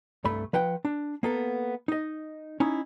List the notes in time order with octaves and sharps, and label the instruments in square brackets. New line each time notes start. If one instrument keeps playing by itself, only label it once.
[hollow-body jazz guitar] C2 G2 A3 B5
F3 B4 F#5 G5
D4
A#3 B3 A4
D#4 D#5
C#4 D#4 E4